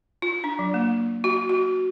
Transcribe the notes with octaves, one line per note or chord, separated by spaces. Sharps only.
F4
D4
F#3
A#3
F#4
F#4